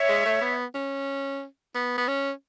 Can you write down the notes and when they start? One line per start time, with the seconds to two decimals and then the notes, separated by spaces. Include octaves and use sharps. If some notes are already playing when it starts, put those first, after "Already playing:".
Already playing: C#5 E5
0.09 G#3
0.25 A3
0.42 B3
0.75 C#4
1.75 B3
1.98 B3
2.08 C#4